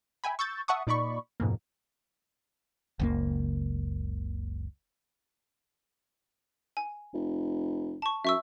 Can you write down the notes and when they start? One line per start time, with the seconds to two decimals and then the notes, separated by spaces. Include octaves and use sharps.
0.24 E5 G5 G#5 B5
0.39 C#6 E6 G6 A6
0.68 E5 F#5 A5 C#6 D#6
0.87 A#2 D#4 D5 B5 C#6
1.40 F2 G#2 B2 A#3
3.00 F#1 C#2 A#3
6.77 G#5
7.14 F1
8.02 A5 C#6
8.25 F#2 E5 C#6 E6